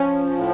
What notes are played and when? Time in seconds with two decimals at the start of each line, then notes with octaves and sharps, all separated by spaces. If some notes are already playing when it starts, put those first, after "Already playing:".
Already playing: F3 C#4
0.37 A2